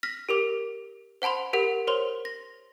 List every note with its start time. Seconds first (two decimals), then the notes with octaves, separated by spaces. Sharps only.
0.03 F6 A#6 B6
0.29 G4 A#4 D6
1.22 C5 F#5 A5 B5 C6
1.53 G4 A#4 F#5
1.87 A#4 C5 C#5 C6
2.25 A#6